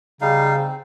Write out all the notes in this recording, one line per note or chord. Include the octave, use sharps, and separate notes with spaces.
C#3 G3 D#4 F5
C4